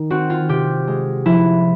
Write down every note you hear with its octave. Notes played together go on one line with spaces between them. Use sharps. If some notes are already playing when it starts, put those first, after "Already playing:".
Already playing: D#3
C4 F#4
F4
C3 G4
G#3
F3 E4